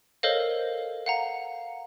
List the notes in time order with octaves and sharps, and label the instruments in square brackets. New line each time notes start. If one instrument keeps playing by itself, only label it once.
[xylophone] A4 A#4 C5 C#5 D#5 F5
F5 F#5 A#5